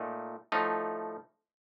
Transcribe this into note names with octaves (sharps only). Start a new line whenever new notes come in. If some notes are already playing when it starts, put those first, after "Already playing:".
Already playing: A#2 A3 D#4
A2 F3 A3 D#4